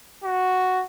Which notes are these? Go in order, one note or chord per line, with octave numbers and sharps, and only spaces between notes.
F#4